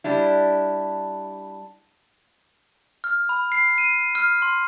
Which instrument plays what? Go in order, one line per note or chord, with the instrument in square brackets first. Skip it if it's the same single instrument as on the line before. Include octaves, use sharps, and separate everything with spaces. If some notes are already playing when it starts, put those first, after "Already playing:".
[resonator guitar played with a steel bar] G3 D4 E4
[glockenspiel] F6
B5
C7
D#7
F6
C6